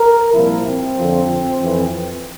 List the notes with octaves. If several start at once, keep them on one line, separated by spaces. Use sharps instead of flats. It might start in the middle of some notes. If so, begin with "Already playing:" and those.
Already playing: A#4
C2 A#2 F3 E4
C4
F2 D3 F3
F2 E3